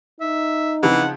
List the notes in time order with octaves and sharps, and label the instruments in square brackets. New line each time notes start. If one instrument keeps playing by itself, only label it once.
[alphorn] D#4 [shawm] E5
[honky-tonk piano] C#3 F3 C4 [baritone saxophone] E3 [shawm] F#5